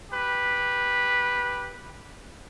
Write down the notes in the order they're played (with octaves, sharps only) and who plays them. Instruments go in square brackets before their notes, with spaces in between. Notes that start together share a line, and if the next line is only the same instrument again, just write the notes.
[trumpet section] G4 B4